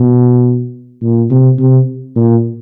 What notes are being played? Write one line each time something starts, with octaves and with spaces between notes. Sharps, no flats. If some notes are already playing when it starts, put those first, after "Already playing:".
Already playing: B2
A#2
C3
C3
A#2